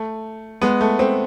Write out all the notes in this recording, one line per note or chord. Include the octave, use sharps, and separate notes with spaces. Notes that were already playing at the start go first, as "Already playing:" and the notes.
Already playing: A3
G#3 B3
A3
A3 C4